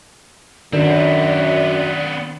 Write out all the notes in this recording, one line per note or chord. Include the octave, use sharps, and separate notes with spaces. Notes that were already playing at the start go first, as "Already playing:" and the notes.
F#2 D#3 B3 C4 D4 A#4 D5